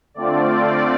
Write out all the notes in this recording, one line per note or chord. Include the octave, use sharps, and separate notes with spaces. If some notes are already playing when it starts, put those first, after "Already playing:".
D3 A3 C4 F4 D5